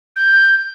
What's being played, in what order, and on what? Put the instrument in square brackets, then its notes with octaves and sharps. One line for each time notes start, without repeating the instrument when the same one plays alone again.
[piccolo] G6